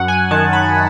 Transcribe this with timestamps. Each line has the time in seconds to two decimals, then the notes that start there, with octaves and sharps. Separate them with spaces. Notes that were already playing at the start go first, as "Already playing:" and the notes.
Already playing: F#2 F#5
0.08 G#5
0.31 D#3 A5
0.53 B5